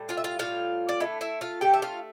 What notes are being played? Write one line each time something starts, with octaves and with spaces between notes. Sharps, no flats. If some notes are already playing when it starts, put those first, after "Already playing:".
Already playing: A2 G3
F4 F5
E5
F4 F5
A2 G3 F4 F5
D5
D3 A3 E4 E5
E4 E5
F4 F5
D3 A3 G4 G5
E5
F4 F5